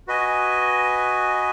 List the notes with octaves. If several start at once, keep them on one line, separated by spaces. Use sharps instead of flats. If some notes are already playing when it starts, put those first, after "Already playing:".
F#4 B4 D#5 G#5